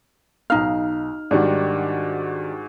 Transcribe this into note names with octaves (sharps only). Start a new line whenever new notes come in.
B1 D#4 F5 F6
G#2 D#3 G3 D4 F#4